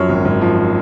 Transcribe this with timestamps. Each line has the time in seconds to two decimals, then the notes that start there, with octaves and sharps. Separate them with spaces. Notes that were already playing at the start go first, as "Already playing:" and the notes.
Already playing: F#2 F3 C#5
0.09 G#1
0.25 G#1
0.41 F3